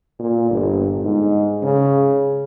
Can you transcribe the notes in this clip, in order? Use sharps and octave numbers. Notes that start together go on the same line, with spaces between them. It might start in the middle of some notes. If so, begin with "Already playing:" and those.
A#2
G1
G#2
C#3